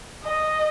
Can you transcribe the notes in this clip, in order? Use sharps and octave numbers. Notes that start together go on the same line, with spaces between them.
D#5